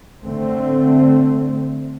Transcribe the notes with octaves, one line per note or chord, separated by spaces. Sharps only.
D3 A3 C4